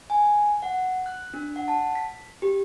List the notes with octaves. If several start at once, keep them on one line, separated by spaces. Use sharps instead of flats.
G#5
F#5
F#6
D4
F#5
A5
B6
G4